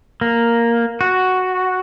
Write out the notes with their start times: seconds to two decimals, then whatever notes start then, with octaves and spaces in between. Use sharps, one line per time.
0.21 A#3
1.01 F#4